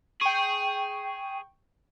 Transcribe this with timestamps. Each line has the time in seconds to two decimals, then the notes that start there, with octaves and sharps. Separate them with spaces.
0.21 G#4 G5 C#6